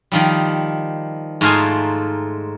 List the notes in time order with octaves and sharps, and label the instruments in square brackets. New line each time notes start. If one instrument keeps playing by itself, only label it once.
[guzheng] D#3 F3 G3
G#2 A3 D#4 F4 F5 G#5